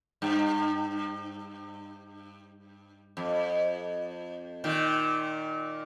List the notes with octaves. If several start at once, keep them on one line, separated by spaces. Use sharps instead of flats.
G2
F2
A#2 D#3